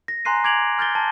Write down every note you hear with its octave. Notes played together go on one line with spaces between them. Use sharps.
A#6
G#5 A#5 C6 F#6 C7 D#7
D6 G#6 D7 F7 F#7
F6 G6 A6 G7
A5